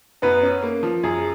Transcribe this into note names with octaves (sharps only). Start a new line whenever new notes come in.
F#2 B3 B4
C#4
A#3
F3
F#2 G#4